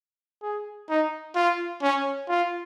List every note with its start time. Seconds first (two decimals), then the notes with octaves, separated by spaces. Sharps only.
0.42 G#4
0.89 D#4
1.36 F4
1.82 C#4
2.28 F4